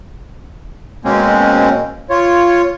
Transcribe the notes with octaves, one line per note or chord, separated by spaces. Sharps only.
B2 G#3 A#3 C4 C#4
F4 C#5